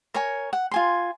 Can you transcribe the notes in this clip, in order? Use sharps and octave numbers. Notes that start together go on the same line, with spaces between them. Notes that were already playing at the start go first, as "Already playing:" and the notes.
A#4 C#5 G#5
F#5
F4 G#5 C6